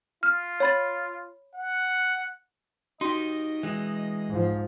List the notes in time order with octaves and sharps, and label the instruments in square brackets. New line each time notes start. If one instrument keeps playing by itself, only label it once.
[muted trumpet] F4 [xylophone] F6
[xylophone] C#5 B5 A6
[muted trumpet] F#5
[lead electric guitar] D#4 G4 [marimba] F#4 C6 [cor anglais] D#5
[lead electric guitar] E3 G#3
[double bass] G#2 F3